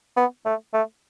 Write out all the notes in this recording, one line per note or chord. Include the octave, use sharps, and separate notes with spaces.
B3
A3
A3